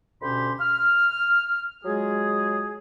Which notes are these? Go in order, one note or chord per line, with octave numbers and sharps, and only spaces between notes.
D2 B2 C#4 G4 B5 C6
F6
F#3 G#3 F4 G#4